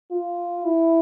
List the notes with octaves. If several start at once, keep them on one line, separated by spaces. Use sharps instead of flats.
F4
E4